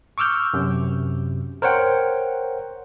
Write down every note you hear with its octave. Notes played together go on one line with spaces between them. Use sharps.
C#6 D6 E6 F6 G6
F#2 C3
A#4 C5 C#5 F#5 G5